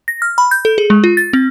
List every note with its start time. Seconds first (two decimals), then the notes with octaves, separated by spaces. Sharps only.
0.08 A#6
0.22 F6
0.38 B5
0.51 G6
0.65 A4
0.78 G#4
0.90 G#3
1.04 F4
1.17 A6
1.33 C4